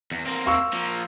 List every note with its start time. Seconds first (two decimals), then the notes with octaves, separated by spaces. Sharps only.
0.11 E2
0.26 A#3 C4
0.46 F5 C#6 E6
0.73 F3 A#3